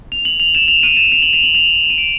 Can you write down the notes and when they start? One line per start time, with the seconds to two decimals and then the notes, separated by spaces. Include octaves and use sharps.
0.12 F7
0.25 F#7
0.40 F7
0.55 E7
0.68 F7
0.83 D#7
0.97 E7
1.12 F7
1.22 F#7
1.33 F7
1.43 F#7
1.55 F7
1.83 E7
1.90 D#7
1.98 D7